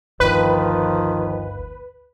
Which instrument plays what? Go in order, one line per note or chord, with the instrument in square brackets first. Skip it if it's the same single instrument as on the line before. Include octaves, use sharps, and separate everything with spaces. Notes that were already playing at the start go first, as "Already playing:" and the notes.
[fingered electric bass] G1 D2 [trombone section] D#3 F3 [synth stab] B4